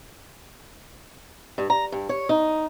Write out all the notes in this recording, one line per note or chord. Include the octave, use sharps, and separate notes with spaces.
G2
A#5
G2
C#5
D#4